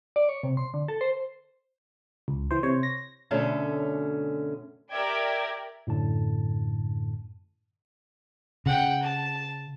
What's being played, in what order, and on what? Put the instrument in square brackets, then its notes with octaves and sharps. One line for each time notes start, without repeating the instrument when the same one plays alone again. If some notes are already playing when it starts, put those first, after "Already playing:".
[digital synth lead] D5
C#5
C3
C6
D3
A4
C5
[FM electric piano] C#2
E3 C5
C3 C5 C#5
A#6
[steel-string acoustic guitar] F#2 B2 D3 A3 C#4
[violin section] G4 A#4 D5 E5 G5 G#6
[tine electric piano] F#2 A2 D3 A5
[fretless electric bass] C#3 [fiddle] F#5 G5
[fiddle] A5